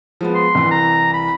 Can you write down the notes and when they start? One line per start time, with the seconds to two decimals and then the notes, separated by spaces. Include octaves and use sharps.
0.21 F3 G#3 B3
0.35 C6
0.55 C2 E3
0.71 A#5
1.13 B5